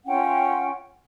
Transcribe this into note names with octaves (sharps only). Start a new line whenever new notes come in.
C#4 F4 F#5 G5